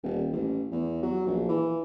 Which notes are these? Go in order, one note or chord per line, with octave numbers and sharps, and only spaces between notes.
D#1
A1
E2
F#3
A#1
E3